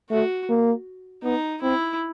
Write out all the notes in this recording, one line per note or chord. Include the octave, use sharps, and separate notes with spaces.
A3 F#4
A#3
B3 D#4
C4 E4